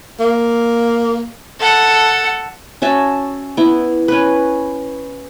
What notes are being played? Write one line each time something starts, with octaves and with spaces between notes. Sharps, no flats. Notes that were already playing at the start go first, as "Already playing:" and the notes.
A#3
A4 F#5
C#4 F#4 E5 A5
B3 E4
C#4 B4